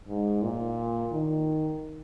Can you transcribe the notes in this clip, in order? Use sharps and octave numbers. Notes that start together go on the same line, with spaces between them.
G#2
A#2
D#3